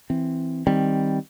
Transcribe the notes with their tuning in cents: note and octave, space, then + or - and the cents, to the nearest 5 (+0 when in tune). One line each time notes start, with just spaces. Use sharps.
E3 +0 C4 +0
D#3 +0 G3 +0 C4 +0